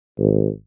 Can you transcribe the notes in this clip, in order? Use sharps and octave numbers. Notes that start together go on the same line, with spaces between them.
G#1